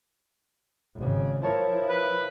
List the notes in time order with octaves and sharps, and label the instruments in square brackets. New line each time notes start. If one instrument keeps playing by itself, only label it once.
[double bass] G#1 C#3
[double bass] F3 E4 [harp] A#4 C#5 A5
[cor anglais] B4